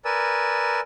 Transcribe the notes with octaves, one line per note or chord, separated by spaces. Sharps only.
A#4 B4 D5 G#5 E6